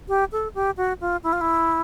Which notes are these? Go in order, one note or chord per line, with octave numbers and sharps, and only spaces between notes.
G4
A4
G4
F#4
F4
E4
F4
E4